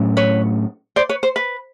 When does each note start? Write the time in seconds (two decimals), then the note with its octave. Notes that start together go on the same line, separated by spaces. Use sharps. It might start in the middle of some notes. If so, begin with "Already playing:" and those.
Already playing: A2 F#3 A3 C#4
0.17 B4 C#5
0.96 C5 D5
1.09 B4 C#5
1.23 C5
1.36 B4